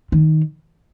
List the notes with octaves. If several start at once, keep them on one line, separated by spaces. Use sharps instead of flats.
D#3